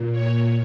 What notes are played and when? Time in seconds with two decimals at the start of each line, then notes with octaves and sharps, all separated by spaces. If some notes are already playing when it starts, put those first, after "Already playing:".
Already playing: A#2
0.12 C#5